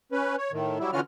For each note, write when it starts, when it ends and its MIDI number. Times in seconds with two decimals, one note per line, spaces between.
0.12 0.36 61
0.12 0.36 71
0.38 0.51 73
0.52 0.79 45
0.52 0.79 51
0.80 0.91 54
0.80 0.91 55
0.80 0.91 64
0.93 1.01 50
0.93 1.01 52
0.93 1.01 61
0.93 1.01 65
0.93 1.01 66
0.93 1.01 89